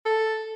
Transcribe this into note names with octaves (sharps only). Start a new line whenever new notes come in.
A4